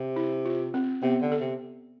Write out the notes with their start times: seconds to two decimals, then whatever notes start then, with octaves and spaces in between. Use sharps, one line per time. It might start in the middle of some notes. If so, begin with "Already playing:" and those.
Already playing: C3
0.16 E4
0.45 F4
0.74 C4
1.02 C3 B3
1.21 D3
1.32 A4
1.40 C3